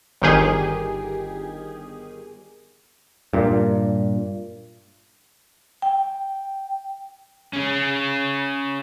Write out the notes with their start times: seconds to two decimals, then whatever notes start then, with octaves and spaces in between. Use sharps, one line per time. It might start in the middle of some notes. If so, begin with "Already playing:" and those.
0.22 G1 D#3 G4 G#4
3.33 G2 A#2
5.82 G5
7.53 C#4 G#4